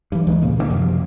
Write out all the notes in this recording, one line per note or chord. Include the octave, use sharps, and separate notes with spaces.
G2 E3
D2 E3 G#3 A3
A#2 C#3 A#3
D#3 E3 A#3
F#2 C3 F3